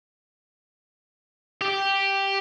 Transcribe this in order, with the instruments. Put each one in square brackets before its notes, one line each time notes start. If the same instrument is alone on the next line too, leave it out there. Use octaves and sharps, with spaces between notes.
[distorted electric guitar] G4